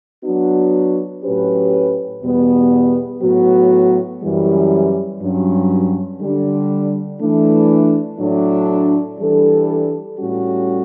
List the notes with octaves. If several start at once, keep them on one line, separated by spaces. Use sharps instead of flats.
F#3 B3 D4 F#4
A2 F#3 C#4 G4 B4
E2 B2 G3 B3
A2 F#3 B3 F#4
F#2 E3 G3
G2 F#3 C#4
D3 G3 D4
E3 A3 D4
A2 F#3 A3 D4
E3 G3 D4 A4
A2 G3 C#4 F#4